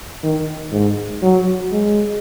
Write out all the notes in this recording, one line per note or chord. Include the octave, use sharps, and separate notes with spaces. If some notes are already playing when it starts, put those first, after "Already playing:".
D#3
G#2
F#3
G#3